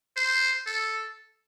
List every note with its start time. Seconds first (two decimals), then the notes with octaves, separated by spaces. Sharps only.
0.17 C5
0.67 A4